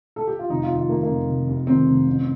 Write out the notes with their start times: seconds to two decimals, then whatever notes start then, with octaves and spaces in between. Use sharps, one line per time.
0.16 A4
0.27 G4
0.39 F4
0.49 F1 D#4
0.63 F4
0.70 D#2
0.77 F4
0.89 D#3 A#3
1.03 A#3
1.08 F1
1.28 F1
1.48 D#2
1.67 D#3 C4
1.87 F1
2.07 A1